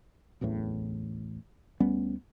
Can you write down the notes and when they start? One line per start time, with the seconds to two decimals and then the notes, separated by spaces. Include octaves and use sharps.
0.41 D1 A1 E2 A2
1.80 D2 G3 B3 C#4